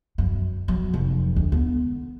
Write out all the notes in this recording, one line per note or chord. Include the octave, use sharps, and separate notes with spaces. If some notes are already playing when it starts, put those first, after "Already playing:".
F#2
F#3
F1
D2
B3